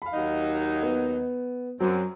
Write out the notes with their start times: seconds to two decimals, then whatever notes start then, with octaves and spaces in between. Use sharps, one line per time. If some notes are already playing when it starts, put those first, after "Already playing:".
0.02 F5 B5
0.14 D#2 F#3 D#4
0.83 B3
1.80 F#2 F#3 C4